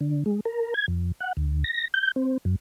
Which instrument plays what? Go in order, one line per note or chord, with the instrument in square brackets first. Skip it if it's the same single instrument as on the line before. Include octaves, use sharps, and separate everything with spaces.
[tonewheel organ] D3
G#3
A#4
G#6
F2
F#5
D2
A#6
G6
C4
F#2